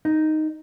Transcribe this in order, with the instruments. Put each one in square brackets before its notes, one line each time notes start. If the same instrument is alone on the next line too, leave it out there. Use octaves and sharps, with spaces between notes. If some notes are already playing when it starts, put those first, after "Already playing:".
[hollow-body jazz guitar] D#4